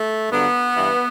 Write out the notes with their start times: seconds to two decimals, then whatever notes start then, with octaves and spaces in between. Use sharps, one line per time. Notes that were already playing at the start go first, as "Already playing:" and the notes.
Already playing: A3
0.30 G2 D3 F#3 B3
0.76 G2 E3